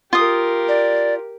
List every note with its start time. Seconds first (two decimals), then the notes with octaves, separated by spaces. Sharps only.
0.13 F4 G4 A#4 D#6
0.69 D5